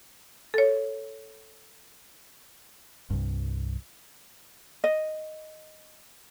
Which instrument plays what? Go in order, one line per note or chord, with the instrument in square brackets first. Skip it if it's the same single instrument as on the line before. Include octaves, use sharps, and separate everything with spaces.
[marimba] A4 C#5
[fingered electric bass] C2 G2
[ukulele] D#5